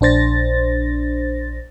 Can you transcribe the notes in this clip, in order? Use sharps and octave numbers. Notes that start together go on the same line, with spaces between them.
A#1 D4 C5 A6 A#6